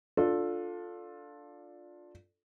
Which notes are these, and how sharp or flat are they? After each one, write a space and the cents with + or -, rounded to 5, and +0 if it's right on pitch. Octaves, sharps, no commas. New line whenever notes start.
D4 +0 F4 +15 A4 +0